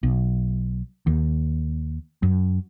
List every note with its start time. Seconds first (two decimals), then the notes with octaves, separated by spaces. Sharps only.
0.03 B1
1.07 D#2
2.23 F#2